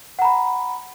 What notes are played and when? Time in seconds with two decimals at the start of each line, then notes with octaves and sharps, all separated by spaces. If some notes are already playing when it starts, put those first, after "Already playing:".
0.19 F#5
0.22 A#5
0.25 B5